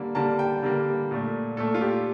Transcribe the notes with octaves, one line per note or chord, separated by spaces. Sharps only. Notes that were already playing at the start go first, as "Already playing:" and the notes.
Already playing: D3 G3 A#3
D3 G3 A#3 A5
G5
D3 G3 A#3
A#2 A3
A#2 A3 A4
F4
G4